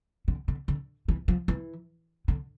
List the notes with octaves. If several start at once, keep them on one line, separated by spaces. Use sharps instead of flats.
D3
D3
D3
E3
F3
E3
D3